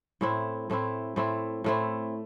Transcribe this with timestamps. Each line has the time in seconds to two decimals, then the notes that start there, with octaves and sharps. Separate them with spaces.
0.21 A2 A3 C4 E4
0.70 A2 A3 C4 E4
1.16 A2 A3 C4 E4
1.64 A2 A3 C4 E4